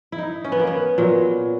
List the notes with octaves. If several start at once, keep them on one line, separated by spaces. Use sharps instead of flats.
E4
D#4
C#4
B3
A#3
B3
A#2 F#3